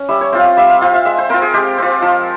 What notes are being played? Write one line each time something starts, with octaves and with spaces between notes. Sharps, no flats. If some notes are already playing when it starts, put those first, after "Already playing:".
Already playing: C#4
G3 E5
C#5
C4 F4 F5
F5
G3 E5
F5
C4 F4 F5
E5
G#3 E5
C5
C4 F4 A#4
G#4
G#3 G4
C4 F4
F3